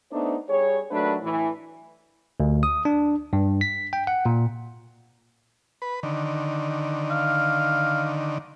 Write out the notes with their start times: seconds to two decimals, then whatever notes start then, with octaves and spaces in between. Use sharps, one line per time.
0.11 A3 B3 D4 D#4 C5
0.49 G3 G#4 C#5
0.92 D#2 F#3 A3 D4 B4
1.22 A2 E3
2.40 D2
2.63 D#6
2.85 D4
3.33 G2
3.61 B6
3.93 G5
4.07 F#5
4.26 A#2
5.82 B4
6.03 D3 D#3
7.11 F5